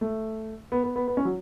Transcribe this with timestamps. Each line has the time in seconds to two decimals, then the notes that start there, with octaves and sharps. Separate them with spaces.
0.01 A3
0.72 B3
0.84 B3
0.96 B3
1.08 B3
1.17 C#4
1.25 F#3